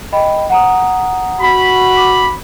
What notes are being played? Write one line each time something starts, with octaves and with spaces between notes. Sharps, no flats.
D#5 G5 B5
F#5 A#5 D#6
F#4 B5
D6